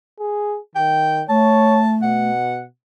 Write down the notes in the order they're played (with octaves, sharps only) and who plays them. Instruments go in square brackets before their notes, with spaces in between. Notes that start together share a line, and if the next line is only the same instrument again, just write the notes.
[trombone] G#4
[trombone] D#3 [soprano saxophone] G5
[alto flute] A3 [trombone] C#5 [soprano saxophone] A5
[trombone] B2 [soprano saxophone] F#5